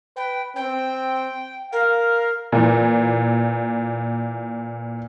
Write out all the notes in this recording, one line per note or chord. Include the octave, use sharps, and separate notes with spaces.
B4 G5
C4 G5
A#4 F5
A#2 E3